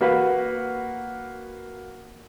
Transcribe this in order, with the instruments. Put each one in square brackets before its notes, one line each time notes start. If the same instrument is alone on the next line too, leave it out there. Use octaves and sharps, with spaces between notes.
[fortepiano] A#3 F#4 B4 F5